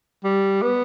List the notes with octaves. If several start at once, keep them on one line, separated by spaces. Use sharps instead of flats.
G3
B3